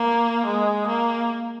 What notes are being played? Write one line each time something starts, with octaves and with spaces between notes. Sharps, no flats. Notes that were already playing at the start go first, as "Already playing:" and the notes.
Already playing: A#3
G#3
A#3